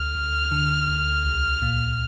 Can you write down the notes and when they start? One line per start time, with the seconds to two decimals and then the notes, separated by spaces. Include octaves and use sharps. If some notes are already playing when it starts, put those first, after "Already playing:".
Already playing: D2 F6
0.15 D2
0.51 D3
0.88 D2
1.25 C2
1.62 A#2